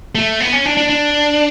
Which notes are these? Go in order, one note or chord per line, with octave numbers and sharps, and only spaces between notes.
A3
B3
C#4
D4
D4
D4